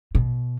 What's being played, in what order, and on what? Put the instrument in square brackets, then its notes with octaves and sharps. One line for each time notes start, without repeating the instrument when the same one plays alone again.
[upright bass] B2